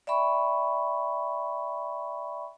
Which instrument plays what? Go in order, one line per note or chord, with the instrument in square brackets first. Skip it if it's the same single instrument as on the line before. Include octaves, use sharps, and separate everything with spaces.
[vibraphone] D5 E5 G5 B5 C#6